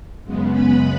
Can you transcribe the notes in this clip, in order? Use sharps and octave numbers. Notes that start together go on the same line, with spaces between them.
F#2 C#3 G#3 B3
B4 B5